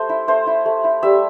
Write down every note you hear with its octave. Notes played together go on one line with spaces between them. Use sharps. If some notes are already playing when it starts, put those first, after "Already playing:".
Already playing: A3 C5
E4
A3 C5
E4
A3
E4
G3 E5